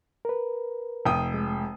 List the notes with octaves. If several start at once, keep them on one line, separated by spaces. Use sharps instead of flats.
A#4 B4
F1 G5 D#6
G#3